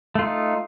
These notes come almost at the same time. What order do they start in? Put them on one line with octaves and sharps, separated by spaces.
A3 F4 D#4